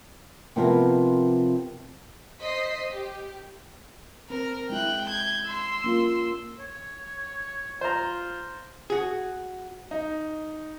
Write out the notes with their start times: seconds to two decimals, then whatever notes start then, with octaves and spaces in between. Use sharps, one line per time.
0.56 C3 F3 B3 C4 E4 A#4
2.42 C5 D#5 B6 C7
2.92 G4
4.30 C4 A#4
4.70 G#3 E4 G5 F#6
5.05 G6 G#6
5.46 C6 E6
5.84 A#3 C#4 F4
6.59 C#5
7.81 F4 C5 A#5
8.90 F#4 G#4
9.91 D#4